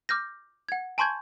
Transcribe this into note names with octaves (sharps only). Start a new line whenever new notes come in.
D6 F6 G6 A#6
F#5 G#6
G#5 A5 C6 C#6 G6 G#6